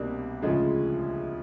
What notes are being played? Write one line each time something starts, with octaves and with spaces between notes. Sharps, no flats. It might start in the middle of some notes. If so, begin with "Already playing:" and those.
Already playing: C2 B2 G3 A#3 D4
D2 C#3 F3 G#3